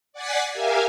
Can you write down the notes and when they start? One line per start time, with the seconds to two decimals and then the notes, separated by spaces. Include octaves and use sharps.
0.13 D5 F#5 G#5 A6 B6 C7
0.52 G4 A#4 E5 F5 G#5